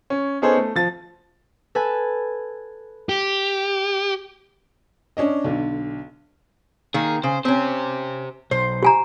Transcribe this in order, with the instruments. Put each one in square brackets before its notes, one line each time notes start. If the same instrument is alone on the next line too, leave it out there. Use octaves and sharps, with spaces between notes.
[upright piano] C#4
B3 C#4 D#4 G#4 A4 C5
A3
F3 A6
[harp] A4 B4 G#5
[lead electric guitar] G4
[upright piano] C#4 D4 D#5
B1 D3
[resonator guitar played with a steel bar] D#3 A#3 [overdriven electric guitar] G#4
[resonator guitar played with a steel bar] C#3 [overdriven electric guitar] C5
[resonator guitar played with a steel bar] C4 C#4 [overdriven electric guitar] G4 C5
[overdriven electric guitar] B1 [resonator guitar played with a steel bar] C5
[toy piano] G4 G#5 A#5